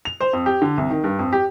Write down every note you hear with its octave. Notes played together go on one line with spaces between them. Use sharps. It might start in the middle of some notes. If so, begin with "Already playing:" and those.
F7
C5
F2
G4
D3
C2
D#3
G2
F2
G4